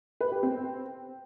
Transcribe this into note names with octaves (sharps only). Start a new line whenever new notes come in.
B4
G4
C4